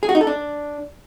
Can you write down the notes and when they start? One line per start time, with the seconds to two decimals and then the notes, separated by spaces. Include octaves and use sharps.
0.03 G#4
0.09 F#4
0.15 D#4
0.21 A4
0.27 D4